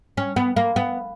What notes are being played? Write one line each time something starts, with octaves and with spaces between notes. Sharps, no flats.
C#4
B3
A#3
B3